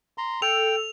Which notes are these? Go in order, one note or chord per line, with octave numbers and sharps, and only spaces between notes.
A#5 C6
A4 G5 F7